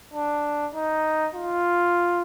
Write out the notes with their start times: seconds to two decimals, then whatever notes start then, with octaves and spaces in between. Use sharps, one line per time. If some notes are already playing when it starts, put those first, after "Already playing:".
0.14 D4
0.75 D#4
1.35 F4